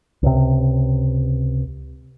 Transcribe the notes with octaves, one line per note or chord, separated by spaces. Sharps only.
C#2 C3